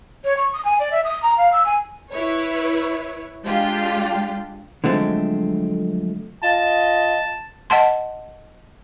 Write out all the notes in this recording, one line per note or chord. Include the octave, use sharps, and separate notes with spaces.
C#5
C#6
D#6
G#5
D5
E5
D#6
A#5
F5
E6
G#5
E4 B4 C#5
G#3 D4 F4 G4
D3 F3 F#3 G#3 A3 C4
F4 D#5 A5
D#5 F#5 A5 C6